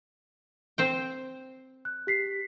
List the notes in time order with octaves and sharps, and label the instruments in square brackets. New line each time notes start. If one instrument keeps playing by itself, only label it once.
[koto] C4 C5 G5
[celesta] F#6
G4 B6 C7